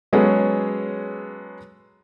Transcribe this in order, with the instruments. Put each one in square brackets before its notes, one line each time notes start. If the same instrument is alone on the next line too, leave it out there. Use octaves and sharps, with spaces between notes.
[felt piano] F#3 G#3 B3 C#4 G#4 A4